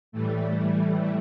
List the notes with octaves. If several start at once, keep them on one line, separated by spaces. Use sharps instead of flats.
A2 E3 G3 A3